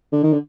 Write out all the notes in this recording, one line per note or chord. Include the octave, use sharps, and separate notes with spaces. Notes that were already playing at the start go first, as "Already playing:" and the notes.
D3
D#3
D3